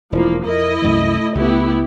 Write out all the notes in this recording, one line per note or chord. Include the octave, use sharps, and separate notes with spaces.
E1 F3 A#3 E4
F2 E4 A#4 D#5
C2 F#2 E3 A3
C#2 B3 E4 G4